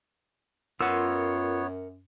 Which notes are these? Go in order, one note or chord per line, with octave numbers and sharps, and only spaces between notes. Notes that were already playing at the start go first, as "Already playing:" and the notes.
F#2 B3 F4 A#4 C#5 F#5 E6